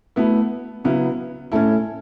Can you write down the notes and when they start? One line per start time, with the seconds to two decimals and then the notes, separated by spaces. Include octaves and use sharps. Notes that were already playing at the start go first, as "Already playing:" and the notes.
0.16 A3 B3 E4 F#4 B4
0.84 C#3 F#3 B3 C#4 E4 F#4 B4
1.52 A2 A3 C#4 E4 A4